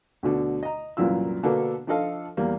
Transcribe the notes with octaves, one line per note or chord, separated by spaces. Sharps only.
D2 B2 D3
D#5 A#5
C2 F#2 A#2 E3 F4 E6
B2 D3 A#3 B3 D4 A4
F3 D4 F4 A4 D#5 F5
E2 G3 A#3